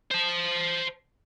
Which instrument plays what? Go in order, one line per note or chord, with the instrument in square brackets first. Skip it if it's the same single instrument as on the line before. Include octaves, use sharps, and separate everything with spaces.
[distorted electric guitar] C5 A5